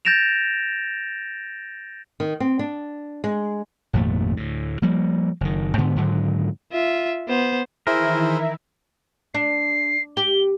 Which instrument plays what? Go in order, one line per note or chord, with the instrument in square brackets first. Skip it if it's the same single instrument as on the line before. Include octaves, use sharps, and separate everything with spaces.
[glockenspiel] G6 A6 A#6 D7 E7 F7
[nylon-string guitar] D#3
C4
D4
G#3
[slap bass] G#1 F2 A#2 A3
D2 A2
F3 G3 A#3
F#1 D#3
G#2 D3 B3
G#2 D3 D#3 F#3
[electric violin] F4 E5
B3 C5
[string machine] D#3 E3 [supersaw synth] E4 E5 [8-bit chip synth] G#4 C5 [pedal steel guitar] A#4
[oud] D4 [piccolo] C7
[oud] G4 [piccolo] G7